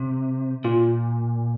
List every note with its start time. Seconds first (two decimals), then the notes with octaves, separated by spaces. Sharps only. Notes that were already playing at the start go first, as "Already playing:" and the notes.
Already playing: C3
0.64 A#2 F4